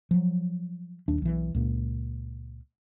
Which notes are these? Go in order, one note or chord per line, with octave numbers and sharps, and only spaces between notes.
F3 F#3
D#1 D#2 D4
B1 E3
C#2 A#2